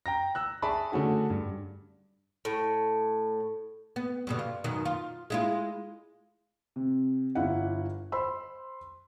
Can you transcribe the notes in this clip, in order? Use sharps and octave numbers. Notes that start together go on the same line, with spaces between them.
G5 A#5 A#6
E6 F#6
G#4 D5 E5 A5 B5 C#6
D3 A3 C#4 F#4 G#4
G2
A2
B3
G2 B2 D3
F4
F#2 B2 D#3
F4
G#3 E4 F4
C3
G1 E3 E4 F5 F#5
C5 B5 C6 E6